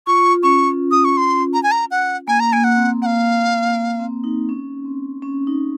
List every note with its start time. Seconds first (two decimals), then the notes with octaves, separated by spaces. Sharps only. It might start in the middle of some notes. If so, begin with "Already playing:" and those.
0.07 F4 C#6
0.43 C#4 C#6
0.91 D#6
1.05 C#6
1.17 C6
1.54 A#5
1.63 G#5
1.71 A#5
1.91 F#5
2.28 A#3 G#5
2.40 A#5
2.53 A#3 G#5
2.64 F#5
2.76 C4
3.02 A#3 F#5
3.06 F5
3.75 A#3
3.99 C4
4.24 D#4
4.49 C#4
4.85 C4
5.22 C#4
5.47 D#4